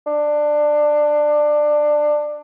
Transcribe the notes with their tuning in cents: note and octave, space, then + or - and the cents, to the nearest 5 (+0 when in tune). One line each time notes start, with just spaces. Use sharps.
D4 +15